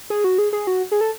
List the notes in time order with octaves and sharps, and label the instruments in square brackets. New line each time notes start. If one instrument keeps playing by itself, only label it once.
[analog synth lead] G#4
F#4
G#4
G#4
F#4
G#4
A4